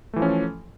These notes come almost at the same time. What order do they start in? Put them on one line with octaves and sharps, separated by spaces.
A3 E3 F3 C#4 A4